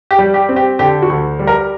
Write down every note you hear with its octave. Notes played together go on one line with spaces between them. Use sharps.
G4
G3
G4
C4
G4
D3 G4
F#4
D2
G3
A#4